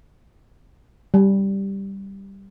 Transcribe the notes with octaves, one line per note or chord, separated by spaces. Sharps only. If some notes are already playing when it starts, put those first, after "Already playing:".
G3